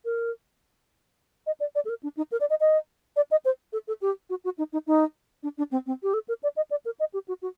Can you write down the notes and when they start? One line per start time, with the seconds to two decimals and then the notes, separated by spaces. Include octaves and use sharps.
0.05 A#4
1.47 D#5
1.60 D5
1.75 D5
1.85 A4
1.89 A#4
2.03 D4
2.17 D#4
2.32 A#4
2.41 D5
2.50 D#5
2.60 D#5
3.16 D5
3.31 D#5
3.45 C5
3.73 A4
3.88 A4
4.02 G4
4.30 F#4
4.44 F#4
4.58 D#4
4.73 D#4
4.87 D#4
5.43 D4
5.58 D4
5.71 C4
5.86 C4
6.03 G4
6.14 A4
6.28 A#4
6.43 D5
6.57 D#5
6.71 D5
6.85 A#4
7.00 D#5
7.14 G4
7.28 F#4
7.42 F#4